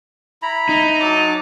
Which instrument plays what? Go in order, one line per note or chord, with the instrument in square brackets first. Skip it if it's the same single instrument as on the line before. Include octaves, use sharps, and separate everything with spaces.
[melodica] E4 A#5 B5
[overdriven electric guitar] D#4
[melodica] F#3 A5 D6